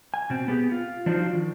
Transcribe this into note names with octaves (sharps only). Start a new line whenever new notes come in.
G#5
B2 C4
B3 G4 G#4
F4
F3 D4 D#4 F4 F#4 C5
D#3